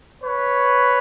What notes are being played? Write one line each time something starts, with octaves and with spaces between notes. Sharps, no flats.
B4 C#5